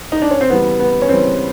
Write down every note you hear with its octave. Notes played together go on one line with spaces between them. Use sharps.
D#4
D4
C#4
C4
C#3 E3 G3 B3
B3
C#4
C#3 E3 G3 C4